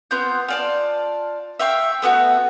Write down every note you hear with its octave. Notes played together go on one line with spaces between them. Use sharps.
B3 C4 F4 G6
F4 D5 A5
E5 F5 G5 C#6
A3 B3 F4 F#4